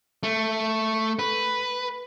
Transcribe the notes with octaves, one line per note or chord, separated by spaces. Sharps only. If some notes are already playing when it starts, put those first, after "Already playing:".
A3
B4